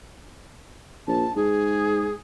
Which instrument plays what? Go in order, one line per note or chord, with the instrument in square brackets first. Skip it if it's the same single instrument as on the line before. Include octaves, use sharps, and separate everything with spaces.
[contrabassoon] A#1 [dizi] A5
[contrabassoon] G#2 [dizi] G#4